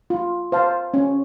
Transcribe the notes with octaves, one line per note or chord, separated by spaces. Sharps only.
F4
C5 F5 A5
C#4